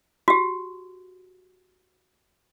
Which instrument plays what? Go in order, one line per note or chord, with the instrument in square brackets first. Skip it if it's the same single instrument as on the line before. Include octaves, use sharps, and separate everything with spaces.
[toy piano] F#4 G4